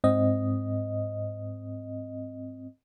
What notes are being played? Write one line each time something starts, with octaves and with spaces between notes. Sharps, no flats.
G#2 C4 D#5